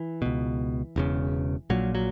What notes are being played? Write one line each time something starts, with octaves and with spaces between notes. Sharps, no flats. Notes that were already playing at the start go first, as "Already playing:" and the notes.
Already playing: E3
C#2 B2
E1 E2 C#3
A#1 A#2 F#3
F#3